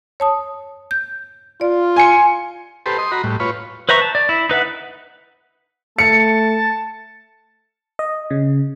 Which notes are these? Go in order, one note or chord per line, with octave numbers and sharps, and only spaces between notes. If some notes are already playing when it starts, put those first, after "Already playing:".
C#5 A5 D#6
G6
F4 D5
G#5 C6 C#7
G4 A4 B4 C5
D#5 C6
F#4 A#5 B5
A2 G3
F4 B4 C#5
B4 C5 E5 A#5 C#6
A5
D5
E4
D#4 B4 E5 F#5
A3 A5 C#7
D#5
C#3